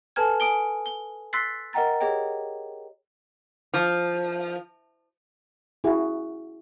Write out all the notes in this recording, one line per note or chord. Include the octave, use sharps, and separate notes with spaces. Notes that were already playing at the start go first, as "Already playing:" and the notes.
A4 B4 G#5 A5 F6 G#6
G#5 D#6 D7 G7
G7
C6 E6 F#6 A6 B6 C7
A#4 D#5 F#5 G5 A#5 A6
G4 G#4 C#5 D#5 G5
F3
E4 F#4 G#4